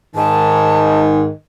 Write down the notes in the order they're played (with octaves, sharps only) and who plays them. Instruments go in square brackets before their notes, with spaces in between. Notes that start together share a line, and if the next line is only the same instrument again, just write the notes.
[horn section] G#2 D#3 [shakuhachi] A5